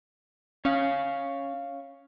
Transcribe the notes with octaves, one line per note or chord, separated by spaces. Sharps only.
C#4 C#5 F5